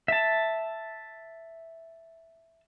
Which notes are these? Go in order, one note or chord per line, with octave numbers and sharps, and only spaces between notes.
E5 A5